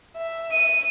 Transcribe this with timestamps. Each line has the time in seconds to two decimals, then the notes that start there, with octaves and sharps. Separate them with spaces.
0.17 E5
0.52 D#7